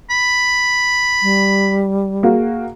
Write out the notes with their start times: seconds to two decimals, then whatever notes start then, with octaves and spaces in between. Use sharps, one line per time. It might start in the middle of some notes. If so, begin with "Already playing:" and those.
0.10 B5
1.22 G3
2.23 A#3 F#4 G#4